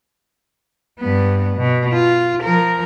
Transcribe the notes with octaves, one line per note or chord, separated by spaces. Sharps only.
G2 B3
B2
F4
F3 A#4